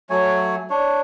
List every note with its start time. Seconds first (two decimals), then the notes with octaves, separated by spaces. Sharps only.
0.10 F#3 A3 C#5 G#5
0.70 D4 C#5